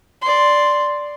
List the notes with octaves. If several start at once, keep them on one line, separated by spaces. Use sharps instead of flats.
D5 C6